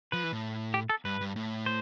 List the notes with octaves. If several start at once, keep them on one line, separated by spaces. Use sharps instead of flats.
F3 B4
E3
A2
G4
A4
G2 B4
G2
A2
C5